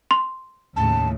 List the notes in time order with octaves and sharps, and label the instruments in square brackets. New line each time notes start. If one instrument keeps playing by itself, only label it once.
[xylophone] C6
[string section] D#2 A2 C#3 [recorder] A5